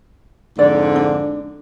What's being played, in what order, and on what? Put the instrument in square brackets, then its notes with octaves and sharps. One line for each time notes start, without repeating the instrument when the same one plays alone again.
[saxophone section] F2 G#2 D3 [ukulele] D5
[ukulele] D4